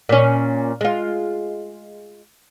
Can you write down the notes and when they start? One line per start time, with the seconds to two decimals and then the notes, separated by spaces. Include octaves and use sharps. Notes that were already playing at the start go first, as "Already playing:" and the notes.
0.09 A#2 C#4
0.81 G#3 F4